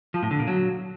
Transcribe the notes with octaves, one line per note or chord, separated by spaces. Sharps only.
F3
A2
D3
A#2
F#3